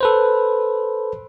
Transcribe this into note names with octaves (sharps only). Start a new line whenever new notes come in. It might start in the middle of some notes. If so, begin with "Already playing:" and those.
A4 B4 C5